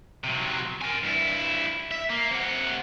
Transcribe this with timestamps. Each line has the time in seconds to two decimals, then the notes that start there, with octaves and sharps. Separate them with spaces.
0.24 C3 F#3
0.82 A#4 G#5
1.04 G2 E4
1.91 E5
2.10 A#3
2.31 C3 F#5